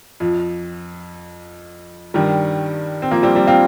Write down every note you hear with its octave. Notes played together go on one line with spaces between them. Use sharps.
F2 F3
G2 D#3 G3
C4
F3 A#3
G3 C4
G3 C4
C4 F4